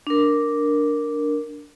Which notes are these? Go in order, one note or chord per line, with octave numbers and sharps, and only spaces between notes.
D4 A#4